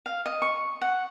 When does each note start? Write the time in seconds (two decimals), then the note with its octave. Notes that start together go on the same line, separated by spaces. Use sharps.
0.06 F5
0.26 D#5
0.42 C#6
0.81 F#5